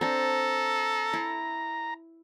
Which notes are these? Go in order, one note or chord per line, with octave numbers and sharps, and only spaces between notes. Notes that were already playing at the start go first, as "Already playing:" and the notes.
C4 D4 A4 A#5
E4